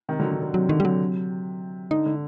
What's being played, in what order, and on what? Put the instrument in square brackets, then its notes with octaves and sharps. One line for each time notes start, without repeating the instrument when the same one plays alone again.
[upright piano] C3 D#3
D3 F#3
D3
D3
[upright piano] C3 [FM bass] F#3
[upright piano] D3 [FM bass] D#3
[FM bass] G3
[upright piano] C3 [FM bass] F#3
[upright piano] D3 [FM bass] D#4
[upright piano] D3